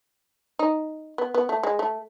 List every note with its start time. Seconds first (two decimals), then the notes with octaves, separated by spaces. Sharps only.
0.59 D#4
1.18 B3
1.34 B3
1.49 A3
1.63 G#3
1.79 A3